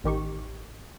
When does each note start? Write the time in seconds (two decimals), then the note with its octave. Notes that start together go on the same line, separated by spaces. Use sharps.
0.04 A1 D#3 G4 C#6